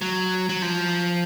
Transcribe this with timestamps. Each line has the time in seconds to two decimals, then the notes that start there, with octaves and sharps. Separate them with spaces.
0.01 F#3
0.49 F#3
0.62 F3